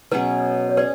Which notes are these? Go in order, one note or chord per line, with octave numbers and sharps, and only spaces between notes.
B2 F#3 C#4 G#4 B4
C#5
C#4 G#4 B4 D5